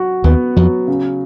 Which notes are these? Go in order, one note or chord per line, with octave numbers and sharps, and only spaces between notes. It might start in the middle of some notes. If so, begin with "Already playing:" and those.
Already playing: F#3 F#4
D#2 D#3 B3
F2 F3 F#3
C#3